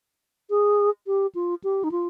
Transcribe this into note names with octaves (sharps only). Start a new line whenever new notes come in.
G#4
G4
F4
G4
D#4
F4